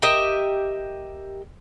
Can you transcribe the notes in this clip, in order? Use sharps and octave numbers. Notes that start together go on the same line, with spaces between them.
G4 A#4 D#5 E5